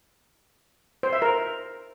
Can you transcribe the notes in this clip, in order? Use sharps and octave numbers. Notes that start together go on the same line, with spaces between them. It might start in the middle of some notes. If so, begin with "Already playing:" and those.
C5
E5
A#4